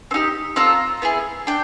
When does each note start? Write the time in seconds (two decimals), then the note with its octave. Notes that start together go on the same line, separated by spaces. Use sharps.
0.11 C4
0.14 D#4 G4
0.56 C4 F4 A4 A#5
1.02 B3 E4 G#4
1.47 D4 G5